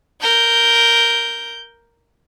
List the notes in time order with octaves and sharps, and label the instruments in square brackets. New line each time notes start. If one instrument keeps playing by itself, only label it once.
[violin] A#4 G6